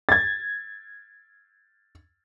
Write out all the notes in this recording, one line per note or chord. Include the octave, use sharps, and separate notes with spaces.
G#6 A6